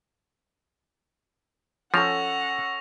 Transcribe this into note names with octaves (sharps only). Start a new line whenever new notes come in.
F3 C#4 A4 F#5 C#6 A#6 F7